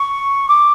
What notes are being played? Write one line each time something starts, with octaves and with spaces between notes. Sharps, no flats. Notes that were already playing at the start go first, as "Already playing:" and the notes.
Already playing: C#6
D6